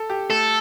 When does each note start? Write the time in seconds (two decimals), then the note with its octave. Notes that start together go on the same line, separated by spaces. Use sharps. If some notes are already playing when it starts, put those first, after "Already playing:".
Already playing: A4
0.10 G4
0.30 A3 A4